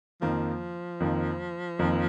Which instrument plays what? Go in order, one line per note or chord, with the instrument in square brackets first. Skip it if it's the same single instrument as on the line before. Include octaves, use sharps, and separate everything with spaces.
[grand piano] F2 D#3 A#3 [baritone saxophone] F3
[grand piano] F2 D#3 A#3
F2 D#3 A#3